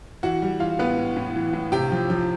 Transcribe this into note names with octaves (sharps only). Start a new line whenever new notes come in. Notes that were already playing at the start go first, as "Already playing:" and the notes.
E3 F#4 F#5
G3
E3 F4 F5
A2 B3 B4
A2
A2
E3
A2
C3 G4 G5
F3
F3